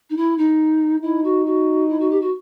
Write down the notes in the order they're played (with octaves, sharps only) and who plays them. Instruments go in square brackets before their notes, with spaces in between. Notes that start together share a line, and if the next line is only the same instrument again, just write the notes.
[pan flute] D#4
E4
D#4
[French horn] D#4 [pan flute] E4
[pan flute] F#4
F#4
E4
F#4
G4
F#4